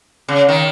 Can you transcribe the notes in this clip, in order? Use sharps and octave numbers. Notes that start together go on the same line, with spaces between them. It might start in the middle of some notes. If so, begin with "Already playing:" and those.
C#3
D#3